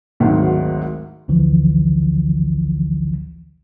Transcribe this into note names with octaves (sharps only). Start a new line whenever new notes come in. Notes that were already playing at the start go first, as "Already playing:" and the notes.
G#1 D2 G#2 D#3 F#3
A1 D2 D3 E3 F3